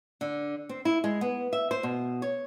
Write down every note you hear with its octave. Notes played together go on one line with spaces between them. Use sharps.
D3
C4
E4
G#3
B3
E5
C5
B2
C#5